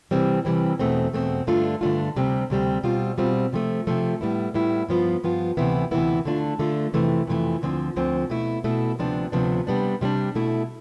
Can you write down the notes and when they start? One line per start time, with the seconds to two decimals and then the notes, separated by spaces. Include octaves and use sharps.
0.11 C3 E3 G3 C4
0.45 C3 E3 G3 C4
0.79 E2 B2 A3 C4
1.13 E2 B2 A3 C4
1.47 G2 D3 A3 D4 F4
1.81 G2 D3 A3 D4 F4
2.16 D2 C3 G3 C4
2.50 D2 C3 G3 C4
2.83 B2 G3 C4 F4
3.18 B2 G3 C4 F4
3.53 C3 F3 A3
3.87 C3 F3 A3
4.21 A2 G3 B3 E4
4.54 A2 G3 B3 E4
4.88 G2 F3 B3 F4
5.24 G2 F3 B3 F4
5.57 D2 C3 E3 B3 E4
5.91 D2 C3 E3 B3 E4
6.25 D3 A3 D4 F4
6.59 D3 A3 D4 F4
6.93 F2 C3 E3 A3
7.27 F2 C3 E3 A3
7.62 D2 D3 F3 C4
7.96 D2 D3 F3 C4
8.30 B2 A3 E4
8.64 B2 A3 E4
8.99 D2 C3 F3 B3 D4
9.32 D2 C3 F3 B3 D4
9.67 C3 G3 B3 D4
10.01 C3 G3 B3 D4
10.35 B2 A3 E4